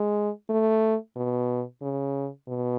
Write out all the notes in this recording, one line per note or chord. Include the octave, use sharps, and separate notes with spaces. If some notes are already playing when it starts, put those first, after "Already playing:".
Already playing: G#3
A3
B2
C#3
B2